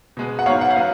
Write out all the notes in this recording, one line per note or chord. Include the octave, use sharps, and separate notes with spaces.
B2 G#3 B3
F#5
G#2 F#3 B3 C#5 F5
F#5
F5
F#3 B3